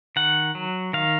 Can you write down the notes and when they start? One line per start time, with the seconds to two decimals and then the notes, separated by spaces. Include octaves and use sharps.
0.16 D#3 F#5
0.55 F#3
0.93 D#3 F5